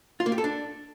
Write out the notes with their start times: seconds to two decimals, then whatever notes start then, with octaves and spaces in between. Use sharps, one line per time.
0.20 F4
0.26 A#3
0.32 G4
0.38 A4
0.44 D4